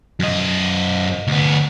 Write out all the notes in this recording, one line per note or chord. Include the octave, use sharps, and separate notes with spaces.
F#2 D#5
D2 B3